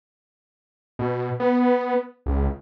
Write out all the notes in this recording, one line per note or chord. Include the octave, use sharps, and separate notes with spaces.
B2
B3
C#2